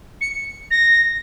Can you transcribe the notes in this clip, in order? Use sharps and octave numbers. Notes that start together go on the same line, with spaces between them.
C#7
A#6